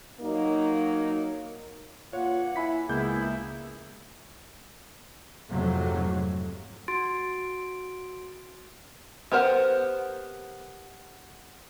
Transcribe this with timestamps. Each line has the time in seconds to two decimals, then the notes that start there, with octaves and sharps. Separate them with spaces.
0.21 F#3 A#3 D#4
2.13 G2 A#3 F4 C#5 F#5
2.56 E4 G#5 B5 B6
2.89 C#2 E3 A#3 B3 E4 G#4 G6
5.50 F2 G#2 C3 F#3 A3
6.88 F#4 C6 A6 D7
9.32 B3 G4 A#4 C5 F#5